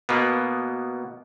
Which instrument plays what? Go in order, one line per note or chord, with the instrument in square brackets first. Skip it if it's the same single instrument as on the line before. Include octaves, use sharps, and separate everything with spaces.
[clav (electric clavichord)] B2 A#3 B3